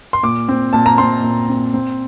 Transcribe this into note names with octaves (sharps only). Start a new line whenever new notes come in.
C6
A#2 D6
C4
A#2 A5
A#5
C4 C6
A#2
C4
C4